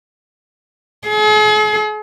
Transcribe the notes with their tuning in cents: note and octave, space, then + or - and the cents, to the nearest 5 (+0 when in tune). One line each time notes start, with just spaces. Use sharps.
G#4 +45